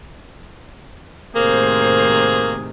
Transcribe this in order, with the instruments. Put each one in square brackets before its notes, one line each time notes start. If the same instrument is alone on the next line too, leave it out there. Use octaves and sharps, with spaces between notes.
[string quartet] A2 C3 D#3 [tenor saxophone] A#3 [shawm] G#4 [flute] C5